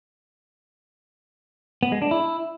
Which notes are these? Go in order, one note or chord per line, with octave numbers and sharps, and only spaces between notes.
B3
G#3
D4
E4